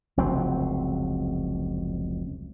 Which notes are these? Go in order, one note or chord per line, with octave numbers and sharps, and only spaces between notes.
F1 C#2 F#3 C4